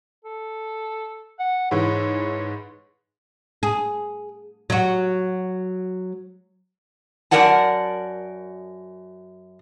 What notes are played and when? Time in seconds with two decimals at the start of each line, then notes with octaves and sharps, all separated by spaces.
0.25 A4
1.39 F#5
1.71 G#2 E3 C#5
3.63 G#4
4.70 F#3 F#4
7.31 F#2 E3 A#4 D5 F#5 A5